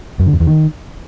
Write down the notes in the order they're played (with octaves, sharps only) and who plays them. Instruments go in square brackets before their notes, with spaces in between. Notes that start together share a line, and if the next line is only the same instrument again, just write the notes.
[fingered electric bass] F#2
D3
F2
E2
D#3